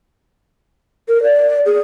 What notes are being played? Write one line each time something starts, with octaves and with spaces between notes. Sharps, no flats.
A#4
D5
G#4